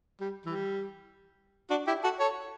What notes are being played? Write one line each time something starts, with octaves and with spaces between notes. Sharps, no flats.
G3
E3 G3
D4 F#4
E4 G4
F#4 A4
A4 C#5